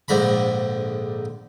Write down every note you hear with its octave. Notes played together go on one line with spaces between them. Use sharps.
A#1 G#2 D3 A#5 B5